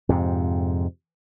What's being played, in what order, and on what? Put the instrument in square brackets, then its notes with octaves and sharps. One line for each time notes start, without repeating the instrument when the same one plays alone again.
[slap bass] F2 G#2 C3